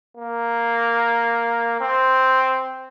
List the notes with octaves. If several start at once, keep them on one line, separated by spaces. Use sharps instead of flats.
A#3
C4